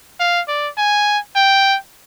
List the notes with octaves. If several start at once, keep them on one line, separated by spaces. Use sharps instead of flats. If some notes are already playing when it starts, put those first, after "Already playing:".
F5
D5
G#5
G5